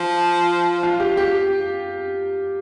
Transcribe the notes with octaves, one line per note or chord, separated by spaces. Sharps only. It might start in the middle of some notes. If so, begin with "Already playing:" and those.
Already playing: F3
F4
G4
G4